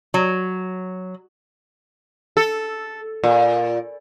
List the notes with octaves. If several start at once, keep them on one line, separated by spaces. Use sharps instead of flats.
F#3
A4
A#2